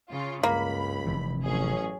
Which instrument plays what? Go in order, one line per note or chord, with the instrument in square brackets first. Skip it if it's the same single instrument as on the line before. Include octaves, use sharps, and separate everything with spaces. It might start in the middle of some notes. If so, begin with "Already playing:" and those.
[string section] C#3 F4
[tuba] C#2 [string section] G2 B5 [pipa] A#3
[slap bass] F1 C3 E3
[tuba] A1 [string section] F#3 C#4 G#4